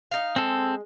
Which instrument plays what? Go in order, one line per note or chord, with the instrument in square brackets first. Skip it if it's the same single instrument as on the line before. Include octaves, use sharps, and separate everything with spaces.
[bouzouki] D#4 F5
[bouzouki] G#3 [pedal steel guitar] C4 A4